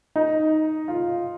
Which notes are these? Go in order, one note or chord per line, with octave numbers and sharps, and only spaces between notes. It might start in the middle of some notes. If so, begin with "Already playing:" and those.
D#4
F4